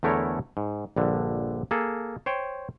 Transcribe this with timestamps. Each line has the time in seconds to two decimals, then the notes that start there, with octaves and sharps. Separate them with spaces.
0.03 E2 D3 A3 E4 A#4 C#5
0.57 G#2
0.96 A#1 G2 D3
1.71 A#3 G#4 A4
2.26 C5 C#5 G5